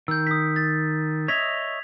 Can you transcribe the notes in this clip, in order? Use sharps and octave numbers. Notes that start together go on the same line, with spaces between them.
D#3 E6 G6
D#6 B6
A6
C#5 D#5 E5 G#6 B6 F7